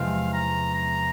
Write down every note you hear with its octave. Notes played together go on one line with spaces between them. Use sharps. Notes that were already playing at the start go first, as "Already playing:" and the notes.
Already playing: E2 C3 F3 G#3 C4 F5
A#5
A#5